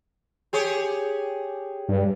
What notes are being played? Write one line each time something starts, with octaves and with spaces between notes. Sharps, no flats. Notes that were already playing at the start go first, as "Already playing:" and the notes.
G4 G#4 C#5
G2